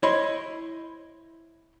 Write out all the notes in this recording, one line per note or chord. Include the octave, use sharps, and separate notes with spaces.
E4 C5 C#5 D#5 B5 C6